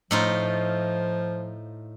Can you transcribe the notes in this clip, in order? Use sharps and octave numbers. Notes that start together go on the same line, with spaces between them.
A2 F3 D#4 F4